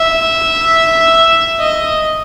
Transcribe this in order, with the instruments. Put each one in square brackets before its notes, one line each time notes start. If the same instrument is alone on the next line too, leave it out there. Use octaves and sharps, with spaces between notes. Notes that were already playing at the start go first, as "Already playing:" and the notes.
Already playing: [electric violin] E5
D#5